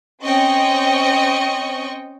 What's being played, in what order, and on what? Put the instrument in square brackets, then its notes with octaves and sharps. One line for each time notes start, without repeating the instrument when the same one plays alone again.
[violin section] C4 C#4 D#5 G5 C#6